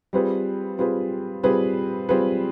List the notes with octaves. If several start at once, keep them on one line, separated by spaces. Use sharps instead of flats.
G3 C4 F4 G#4 B4
G3 C4 F4 G#4 B4
G3 C4 F4 G#4 B4
G3 C4 F4 G#4 B4